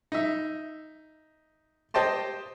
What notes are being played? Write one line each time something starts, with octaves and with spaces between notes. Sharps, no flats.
D#4 E5
G4 C5 D#5 G5 A5 C6